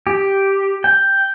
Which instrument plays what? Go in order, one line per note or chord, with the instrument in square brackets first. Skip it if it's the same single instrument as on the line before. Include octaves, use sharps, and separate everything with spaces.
[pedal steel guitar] G4
G5